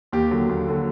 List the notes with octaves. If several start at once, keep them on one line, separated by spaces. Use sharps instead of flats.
D#2 G4
D3 F#3
D#2
D3 F#3